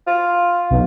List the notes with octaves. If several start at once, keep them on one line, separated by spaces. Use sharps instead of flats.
F4
B1